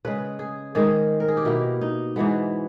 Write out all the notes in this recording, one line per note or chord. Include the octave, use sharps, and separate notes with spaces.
C#3 G#3 B4
G#4
G#2 D#3 G#3 G#4
A#4
G#4
G4
B2 A#3 E4
D#4
G#2 E3 G#3 B3